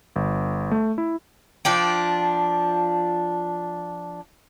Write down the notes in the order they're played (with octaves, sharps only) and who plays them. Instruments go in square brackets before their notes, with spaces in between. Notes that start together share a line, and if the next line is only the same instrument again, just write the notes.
[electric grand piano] G1
A3
E4
[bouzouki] F3 D4 G5